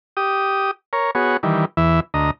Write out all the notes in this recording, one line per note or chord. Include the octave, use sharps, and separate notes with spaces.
G4 D#6
A#4 C#5
B3 F#4 G#4 C#5
D#3 E3 G3
E2 E3 E5
D2 D#5 A#5